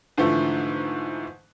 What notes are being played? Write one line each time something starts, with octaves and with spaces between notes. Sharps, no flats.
G#2 D3 E3 F3 A3